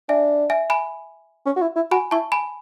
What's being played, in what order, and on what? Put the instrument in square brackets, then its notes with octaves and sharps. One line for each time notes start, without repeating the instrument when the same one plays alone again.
[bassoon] D4 [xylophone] E5 G#5
[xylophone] E5 G#5
G#5 B5
[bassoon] C#4
F#4
E4
E4
[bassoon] F#4 [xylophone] G#5 B5
[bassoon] E4 [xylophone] A5 C#6
[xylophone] G#5 B5